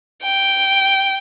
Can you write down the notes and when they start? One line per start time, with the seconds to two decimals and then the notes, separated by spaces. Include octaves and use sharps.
0.23 G5